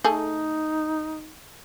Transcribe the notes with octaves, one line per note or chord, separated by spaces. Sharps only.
A3 D#4 G#4 A4